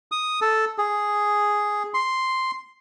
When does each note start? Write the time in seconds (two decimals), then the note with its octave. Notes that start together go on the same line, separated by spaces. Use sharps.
0.12 D#6
0.41 A4
0.78 G#4
1.94 C6